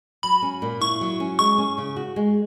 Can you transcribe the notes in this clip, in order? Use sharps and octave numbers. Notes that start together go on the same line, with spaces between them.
F#3 B5
C#4
A#2
E4 C#6
F#3
C#4
G#3 C#6
C#4
C#3
F#4
G#3